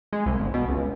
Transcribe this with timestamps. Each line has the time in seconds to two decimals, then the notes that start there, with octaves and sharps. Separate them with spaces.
0.13 G#3
0.26 C2
0.39 G1
0.54 B2
0.68 C#2